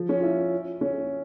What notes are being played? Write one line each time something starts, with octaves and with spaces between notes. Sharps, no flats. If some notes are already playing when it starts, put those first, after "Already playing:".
Already playing: F3
C#4
F4
E4
C#4